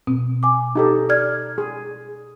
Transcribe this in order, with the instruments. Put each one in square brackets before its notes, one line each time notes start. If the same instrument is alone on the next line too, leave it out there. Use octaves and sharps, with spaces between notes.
[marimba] B2 C4
G#5 D6
[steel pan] D#4 G4 A4
[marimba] D5 F6 G#6
[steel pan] G#4